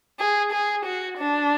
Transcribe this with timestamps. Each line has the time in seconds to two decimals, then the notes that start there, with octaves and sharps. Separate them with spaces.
0.19 G#4
0.52 G#4
0.85 F#4
1.18 D4